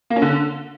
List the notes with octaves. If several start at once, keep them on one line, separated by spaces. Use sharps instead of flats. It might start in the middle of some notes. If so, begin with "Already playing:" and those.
A#3
C#4
D3